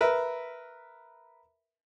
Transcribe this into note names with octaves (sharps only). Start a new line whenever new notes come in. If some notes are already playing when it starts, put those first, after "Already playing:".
A#4 B4 E5